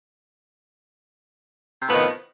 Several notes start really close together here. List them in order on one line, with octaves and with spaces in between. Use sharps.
C3 A2 B3 F3 D#3